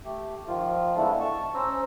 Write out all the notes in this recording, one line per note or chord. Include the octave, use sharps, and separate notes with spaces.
A3 G4
D#3 F3 F4
G#3 A3 B3 D4 E4 A4
A5 C#6
C#4 C5 A#5 E6